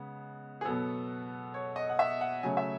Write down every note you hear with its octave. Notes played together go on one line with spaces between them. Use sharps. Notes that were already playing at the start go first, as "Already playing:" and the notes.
Already playing: C#3 G#3 B3
G#4
B2 F#3 B3 A4
C#5
D#5
F#5
E5
F#5
C#3 F#3 A3 C#4 G#5
E5